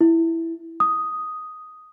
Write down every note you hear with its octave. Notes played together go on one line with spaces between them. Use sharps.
E4
D#6